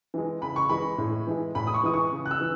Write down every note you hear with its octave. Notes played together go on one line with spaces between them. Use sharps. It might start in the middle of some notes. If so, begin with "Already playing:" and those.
E3 G#3
C#3 B5
C#6
E3 G#3 B5
A2
E3 G#3
A2 B5
D#6
C#6
E3 G#3 D#6
C#6
C#3
F#6
E6
E3